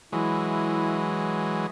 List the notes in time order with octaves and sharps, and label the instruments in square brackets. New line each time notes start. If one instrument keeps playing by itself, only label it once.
[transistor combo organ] E3 F#3 G#3 [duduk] E4